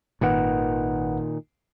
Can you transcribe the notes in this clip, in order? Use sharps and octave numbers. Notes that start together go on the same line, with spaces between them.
G#1 A#2 D#3 B4 F#5